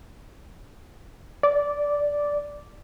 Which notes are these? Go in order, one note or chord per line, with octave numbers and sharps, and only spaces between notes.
D5